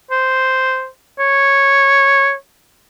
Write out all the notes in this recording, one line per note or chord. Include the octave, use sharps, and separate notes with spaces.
C5
C#5